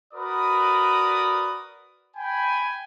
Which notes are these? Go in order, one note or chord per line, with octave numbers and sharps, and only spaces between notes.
F#4 A#4 B4 D5 B5 D#6
G5 G#5 B5